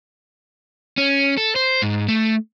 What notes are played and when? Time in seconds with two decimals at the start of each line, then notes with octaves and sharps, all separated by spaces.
0.98 C#4
1.37 A4
1.56 C5
1.82 G#2
2.08 A3